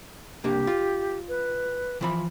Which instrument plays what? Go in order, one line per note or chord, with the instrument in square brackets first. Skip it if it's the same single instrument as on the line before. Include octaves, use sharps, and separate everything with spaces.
[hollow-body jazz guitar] C2 A#3 D4 [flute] G4
[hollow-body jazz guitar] F4
[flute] B4
[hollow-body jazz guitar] E3 F3 B5